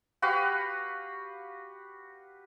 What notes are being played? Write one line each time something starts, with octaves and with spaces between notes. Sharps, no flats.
F#4 G4 B4 F5